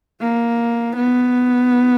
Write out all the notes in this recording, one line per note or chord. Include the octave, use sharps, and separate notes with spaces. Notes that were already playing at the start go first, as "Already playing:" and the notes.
A#3
B3